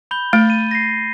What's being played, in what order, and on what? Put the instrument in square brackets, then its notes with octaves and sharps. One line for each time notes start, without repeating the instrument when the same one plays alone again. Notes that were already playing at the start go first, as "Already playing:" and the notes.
[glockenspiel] B5 G6 G7
[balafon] A3 [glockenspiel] A6
[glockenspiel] D#7
A#6 C7